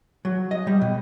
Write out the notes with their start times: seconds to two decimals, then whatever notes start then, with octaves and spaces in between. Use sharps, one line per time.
0.25 F#3
0.51 D#5
0.67 G3
0.81 B2